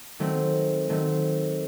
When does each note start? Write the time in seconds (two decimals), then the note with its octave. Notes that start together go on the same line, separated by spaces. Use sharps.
0.19 D#3 F#3 A3 C4
0.89 D#3 F#3 A3 C4